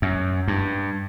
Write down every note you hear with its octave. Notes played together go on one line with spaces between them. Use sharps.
F#2
G2